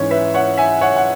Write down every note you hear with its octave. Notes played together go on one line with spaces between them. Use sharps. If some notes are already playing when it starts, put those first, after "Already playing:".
Already playing: G#2 E3 C#4 C#5
B4 E5
C#5 F#5
E5 G#5
C#5 F#5
F#5